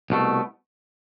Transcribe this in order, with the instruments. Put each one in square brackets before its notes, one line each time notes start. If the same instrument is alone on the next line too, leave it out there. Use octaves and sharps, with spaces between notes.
[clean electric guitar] C2 B2 A3